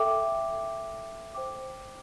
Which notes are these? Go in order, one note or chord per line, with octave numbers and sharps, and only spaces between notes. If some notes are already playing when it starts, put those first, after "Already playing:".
Already playing: A4 E5 G5 D6
C5 G5 D6